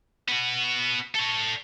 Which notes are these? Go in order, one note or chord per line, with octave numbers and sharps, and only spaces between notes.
B3 F#4
A4 C#5